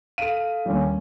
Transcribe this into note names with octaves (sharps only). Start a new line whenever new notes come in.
A4 F5 D#7
D#2 G3 C#4